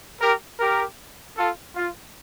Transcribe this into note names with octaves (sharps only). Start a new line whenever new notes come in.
G4 A#4
G4 A#4
F4 A4
F4